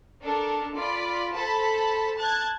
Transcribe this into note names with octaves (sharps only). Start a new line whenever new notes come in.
D4 A4 A#4
F4 D5 B5
A4 C5 A5 B5
A5 F#6 G#6